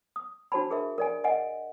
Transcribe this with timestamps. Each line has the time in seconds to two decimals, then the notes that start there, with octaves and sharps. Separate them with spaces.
0.16 D#6
0.52 D4 F#4 C5 A5 B5
0.71 G#4 A#4 E5
0.98 A#4 D5 G#5
1.24 D#5 F#5 G#5